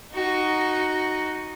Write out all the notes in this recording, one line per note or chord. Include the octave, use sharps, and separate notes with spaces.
D#4 F#4